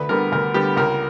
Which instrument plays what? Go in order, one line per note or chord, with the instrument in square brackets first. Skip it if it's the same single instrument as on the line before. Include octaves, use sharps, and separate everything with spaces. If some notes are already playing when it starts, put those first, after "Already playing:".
Already playing: [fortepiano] D2 B4
D3 G3 B3 A#4
D2 A#4
D3 G3 B3 G4
C#2 A#4